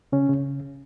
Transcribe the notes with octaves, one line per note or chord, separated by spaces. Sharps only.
C#3 C#4
C#3